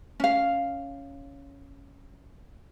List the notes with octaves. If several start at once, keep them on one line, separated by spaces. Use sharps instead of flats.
C#4 F5